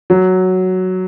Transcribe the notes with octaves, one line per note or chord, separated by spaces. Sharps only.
F#3